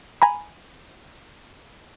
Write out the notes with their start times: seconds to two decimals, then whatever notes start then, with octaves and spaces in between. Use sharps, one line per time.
0.22 G#5 A#5 B5